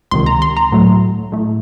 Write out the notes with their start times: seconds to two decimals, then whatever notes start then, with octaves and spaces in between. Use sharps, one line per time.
0.11 C#2 C3 D#3 C6
0.26 A#5
0.42 C6
0.57 A#5
0.72 A2 F#3 A3
1.32 A2 A3